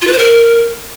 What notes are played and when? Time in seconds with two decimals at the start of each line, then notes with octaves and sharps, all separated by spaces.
0.02 F4
0.07 B4
0.13 C5
0.18 A#4